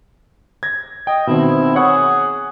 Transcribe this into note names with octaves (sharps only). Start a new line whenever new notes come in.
G#6 A#6
D#5 G5
B2 D#3 C4 E4
G#4 C#5 F#5 C#6